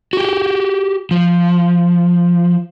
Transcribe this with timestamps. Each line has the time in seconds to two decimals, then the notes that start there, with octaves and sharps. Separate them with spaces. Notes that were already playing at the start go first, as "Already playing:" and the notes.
0.13 F#4 G4
1.11 F3